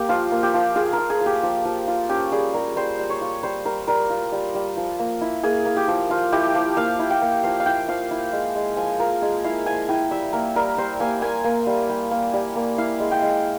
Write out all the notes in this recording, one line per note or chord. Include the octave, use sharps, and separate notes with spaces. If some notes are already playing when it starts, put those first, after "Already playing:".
Already playing: A#3 G4
F3 F4
A#3
G4
F3
F4 G#4
A#4
F4
G#4
F3
G4
F3
F3
F4
C#4 G4
G3 G#4
G3 A#4
G3 C5
G3
C#5
F4
G3 C5
G3 A#4
G3 A#4
F4
G3
G3
F3
A#3
E4
A#3 G#4
A#3
G4
F3
F3 F4
E4 G4
F3
A#3 F5
E4
G5
A#3
F3 F5
F5
E4 G5
F3 F5
E4
G#3
G#3
F3 G#5
F3 A#4
G#3 G#4
E4 F5
F3 G#5
E4 G5
G3 E5
A#3 A#4
G3 A#4
G3 C5
A#3 G#5
A#3 G#5
A#3
G3
G3
A#3
G3
A#3
E4 F5
G#3
G5
G#3